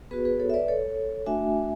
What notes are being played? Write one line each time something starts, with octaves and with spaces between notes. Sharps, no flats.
B3 F#4 G#4 B4
G#4 B4
A4 C#5
E5
B4 D5
A4 C#5
A3 D4 F#4 E5 G#5